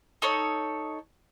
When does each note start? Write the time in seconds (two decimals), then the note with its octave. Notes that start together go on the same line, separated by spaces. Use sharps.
0.22 D#4 A4 C#5